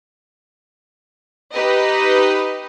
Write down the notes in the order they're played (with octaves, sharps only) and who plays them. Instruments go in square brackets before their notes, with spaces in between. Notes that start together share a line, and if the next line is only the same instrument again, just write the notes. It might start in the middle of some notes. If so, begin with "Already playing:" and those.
[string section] D#4 G4 B4 D#5